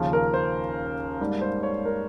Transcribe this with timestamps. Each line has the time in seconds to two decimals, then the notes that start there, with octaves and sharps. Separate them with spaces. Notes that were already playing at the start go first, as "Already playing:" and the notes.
Already playing: D#2 C#3 F3
0.13 A#4
0.34 C5
1.20 G#2 G3 A#3
1.41 C5
1.63 C#5
1.85 A#4